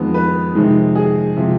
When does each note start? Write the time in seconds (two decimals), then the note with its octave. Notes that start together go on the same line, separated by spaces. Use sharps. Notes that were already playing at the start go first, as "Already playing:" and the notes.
Already playing: F2 D#3 G#3 B3
0.14 B4
0.55 F2 C3 D#3 G#3
0.95 G#4
1.37 C3 F3 G#3